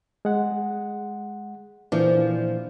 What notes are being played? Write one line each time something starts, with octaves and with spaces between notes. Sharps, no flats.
G#3 F#5
A#2 E3 F3 D4